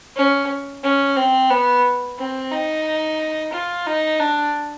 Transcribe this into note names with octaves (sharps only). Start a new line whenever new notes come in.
C#4
C#4
C4
B3
C4
D#4
F4
D#4
D4